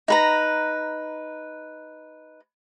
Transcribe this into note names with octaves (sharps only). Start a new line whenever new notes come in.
D#4 B4 A#5